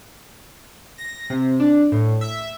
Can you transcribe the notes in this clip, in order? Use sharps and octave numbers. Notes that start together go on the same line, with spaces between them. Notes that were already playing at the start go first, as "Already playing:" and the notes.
A#6
C3
D4
A2
E5